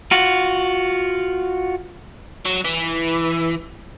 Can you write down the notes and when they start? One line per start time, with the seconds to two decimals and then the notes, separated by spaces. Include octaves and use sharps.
0.11 F4 F#4
2.46 F#3
2.65 E3